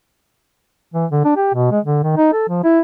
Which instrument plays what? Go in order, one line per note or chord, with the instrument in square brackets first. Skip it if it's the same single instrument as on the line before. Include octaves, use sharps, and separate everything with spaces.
[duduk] E3
D3
D4
G4
B2
G#3
D3
D#3
D#4
A4
F3
E4